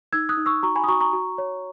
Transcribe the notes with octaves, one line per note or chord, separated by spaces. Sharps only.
D#4 E6 G#6
D#6 F#6
D#4
C#6 E6
F#4 A#5 C#6
G#5 B5
D#6
F#4 A#5 C#6
A#5 C#6
F#4
C#5